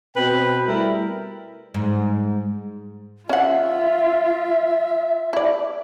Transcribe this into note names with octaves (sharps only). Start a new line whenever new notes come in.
B2 C4 B4 G5
G3 A3 E4 A#4
G#2
C#4 F4 E5 F#5
E4 D5